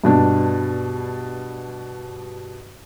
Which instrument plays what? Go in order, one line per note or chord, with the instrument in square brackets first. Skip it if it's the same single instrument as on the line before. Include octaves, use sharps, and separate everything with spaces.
[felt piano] G2 B2 D4